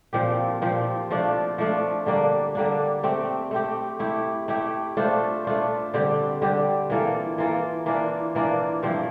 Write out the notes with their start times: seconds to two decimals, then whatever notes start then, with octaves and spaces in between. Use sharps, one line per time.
0.13 A#2 F3 C4 G4
0.62 A#2 F3 C4 G4
1.10 F3 A3 D4 F4
1.58 F3 A3 D4 F4
2.06 D3 G3 A#3 D4
2.55 D3 G3 A#3 D4
3.03 A3 C4 G4
3.51 A3 C4 G4
3.99 A3 E4 G4
4.48 A3 E4 G4
4.97 A3 D4 F4 C5
5.45 A3 D4 F4 C5
5.94 D3 G3 C4 G4
6.42 D3 G3 C4 G4
6.90 E3 A#3 F4 A4
7.38 E3 A#3 F4 A4
7.86 E3 A#3 D4 F4
8.35 E3 A#3 D4 F4
8.83 G2 F3 C4 E4